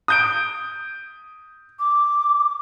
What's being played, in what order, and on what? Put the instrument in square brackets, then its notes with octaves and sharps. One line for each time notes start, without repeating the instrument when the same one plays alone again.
[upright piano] D#6 G6 D7
[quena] D6